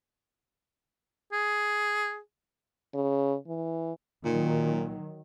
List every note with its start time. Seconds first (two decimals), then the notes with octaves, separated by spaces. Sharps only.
1.33 G#4
2.94 C#3
3.47 E3
4.25 A#2 D#3 F#3